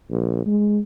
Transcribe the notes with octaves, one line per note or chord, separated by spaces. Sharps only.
A#1
G#3